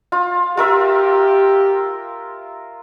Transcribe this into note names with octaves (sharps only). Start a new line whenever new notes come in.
F4
F4 G4 A#4 E5